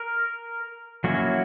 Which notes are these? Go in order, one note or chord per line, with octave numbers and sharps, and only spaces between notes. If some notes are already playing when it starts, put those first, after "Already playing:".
Already playing: A#4
F#3 A#3 C#4 E4 F#4